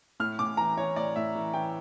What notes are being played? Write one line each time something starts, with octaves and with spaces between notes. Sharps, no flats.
A2 F6
A2 D6
E3 A#5
E3 C#5
A2 D5
A2 E5
E3
E3 G5